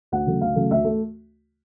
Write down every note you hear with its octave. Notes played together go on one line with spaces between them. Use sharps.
D2 F#5
C#3 F#3 A3
D2 F5
C#3 F#3 A3
D2 E5
A3